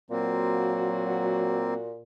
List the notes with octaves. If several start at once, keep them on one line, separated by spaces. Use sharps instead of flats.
A#2 F#3 A#3 C4 F#4